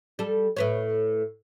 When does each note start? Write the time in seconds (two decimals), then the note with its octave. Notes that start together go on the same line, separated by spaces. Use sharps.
0.19 G3 A4
0.57 A2 B4 C#5